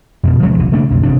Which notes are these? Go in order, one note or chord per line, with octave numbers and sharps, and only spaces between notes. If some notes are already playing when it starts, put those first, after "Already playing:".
F2 B2
D#1 F3 G#3 C#4
F1 B1 E3
C#3 A3 A#3 D4
B1 F2
G1 G#2 C3 D4